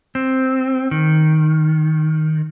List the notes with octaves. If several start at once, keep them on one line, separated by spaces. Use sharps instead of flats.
C4
D#3